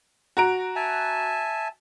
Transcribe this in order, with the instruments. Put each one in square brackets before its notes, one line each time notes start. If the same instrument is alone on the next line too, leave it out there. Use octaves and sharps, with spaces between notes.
[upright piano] F#4 A#5 D7
[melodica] E5 G#5 A5